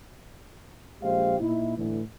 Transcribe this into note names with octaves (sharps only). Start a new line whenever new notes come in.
A#1 G#3 G4 C5 F5
A#2 D#4 E4
A2 D3 E3